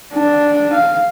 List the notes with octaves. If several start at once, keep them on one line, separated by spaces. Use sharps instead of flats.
D4
F5